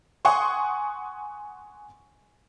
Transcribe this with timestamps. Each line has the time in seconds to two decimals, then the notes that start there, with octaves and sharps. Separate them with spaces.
0.25 F#5 G#5 C6 C#6 D#6